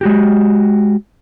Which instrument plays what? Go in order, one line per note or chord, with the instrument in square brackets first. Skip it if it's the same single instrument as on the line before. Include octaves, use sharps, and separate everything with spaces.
[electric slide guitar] G#3 F#4 G4